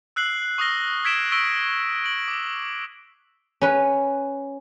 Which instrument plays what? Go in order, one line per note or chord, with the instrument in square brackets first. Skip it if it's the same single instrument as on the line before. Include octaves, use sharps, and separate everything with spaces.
[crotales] E6 F#6 C7 F#7
C#6 D#6 F6 A#6 G7
E6 G#6 B6 D7 E7 G7
C#6 E6 A#6 D7 G7
D7 F#7
D6
[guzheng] C#4 B4